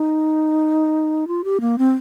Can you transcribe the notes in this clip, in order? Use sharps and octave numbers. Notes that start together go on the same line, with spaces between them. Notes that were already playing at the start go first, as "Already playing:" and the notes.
Already playing: D#4
F4
G4
A#3
C4